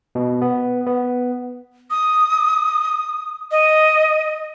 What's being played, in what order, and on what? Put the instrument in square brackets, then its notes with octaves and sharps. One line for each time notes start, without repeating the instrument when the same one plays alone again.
[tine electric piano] B2
B3
B3
[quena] D#6
D#5